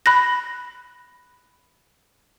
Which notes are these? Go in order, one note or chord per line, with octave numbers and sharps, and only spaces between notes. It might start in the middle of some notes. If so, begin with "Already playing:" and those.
B5 F#6 A#6